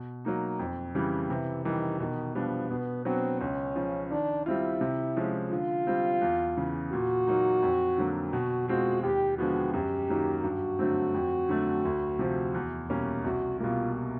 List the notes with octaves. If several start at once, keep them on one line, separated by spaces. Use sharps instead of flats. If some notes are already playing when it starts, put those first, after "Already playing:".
Already playing: B2
F#3 A#3 D#4
F2
C#3 E3 G3
C3 E3
D#3 E3 G3
B2 D#3
F3 G3 B3 D4
B2 B3
F#3 B3 C4 D4 F#4
C#2 C#4
C#3 F3
D#3 D4
G3 C4 E4 F4
C3
F3 G#3 C#4
D3 F4
G3 C4
E2
C#3 E3
A#2 F#4
F#3 A#3 D#4
F2
D3 F#3 A#3
B2 F#4
G#3 C4 F4 F#4
D#2 G4
D3 F3 G#3 B3 F#4
F#2 G4
D#3 F#3 A#3 D#4
G2 F#4
D3 F#3 A3 C4
F2
D3 F#3 A3
D2
C3 F3
E2
B2 G3 A#3 C#4
C2 F#4
B2 G3 A#3 F4